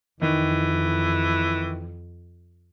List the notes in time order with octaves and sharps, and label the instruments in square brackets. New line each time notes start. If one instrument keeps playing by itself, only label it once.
[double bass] F2 [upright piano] D#3 [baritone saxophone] E3